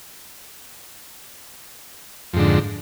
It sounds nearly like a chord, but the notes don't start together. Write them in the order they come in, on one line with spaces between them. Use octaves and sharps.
F2 G#2 D3